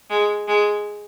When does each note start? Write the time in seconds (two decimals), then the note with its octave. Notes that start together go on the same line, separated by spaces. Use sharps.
0.10 G#3
0.48 G#3